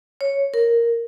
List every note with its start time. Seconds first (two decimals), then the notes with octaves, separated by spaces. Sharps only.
0.21 C#5
0.54 A#4